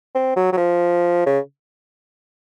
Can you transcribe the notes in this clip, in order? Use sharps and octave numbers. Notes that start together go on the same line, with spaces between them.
C4
F#3
F#3
F3
C#3